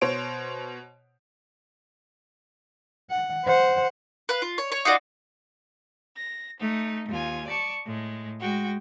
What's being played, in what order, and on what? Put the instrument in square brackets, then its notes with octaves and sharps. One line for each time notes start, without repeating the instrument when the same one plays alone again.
[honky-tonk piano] B2 C5 C#5 D7
[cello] F#5
C5 F#5
[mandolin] B4 F5
F4
C#5
C#5
D#4 F4 F#4 D5
[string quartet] A#6
A3 D#4
D#2 F4 G#5
D5 A5 C#6
A2 G#3
G#3 F#4 G5